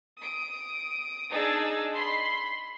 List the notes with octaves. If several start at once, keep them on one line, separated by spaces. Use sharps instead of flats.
D#6 D7
D4 D#4 G#4 E6 A6
B5 C6